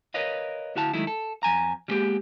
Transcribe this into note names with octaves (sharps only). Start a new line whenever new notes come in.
A#4 B4 C#5 D#5 F5
D2 E4 F#4 F5 A5
D#3 F#3 G#3 A3 E4
A4
F2 G#5 A#5
G3 G#3 A#3 B3 G4 G#4